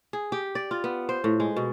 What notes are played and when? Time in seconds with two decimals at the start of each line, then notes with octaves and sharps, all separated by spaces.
0.13 G#4
0.32 G4
0.55 D5
0.71 F4
0.84 B3
1.09 C5
1.24 A2
1.40 G#3
1.56 B2